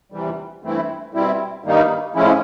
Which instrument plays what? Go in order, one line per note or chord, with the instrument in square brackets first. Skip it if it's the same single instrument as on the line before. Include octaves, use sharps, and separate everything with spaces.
[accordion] E2 C3 E3 G3
G2 E3 A3 C4 E4
B2 G3 C4 E4
G2 D#3 G3 A#3 D#4
A2 F3 G#3 C#4 E4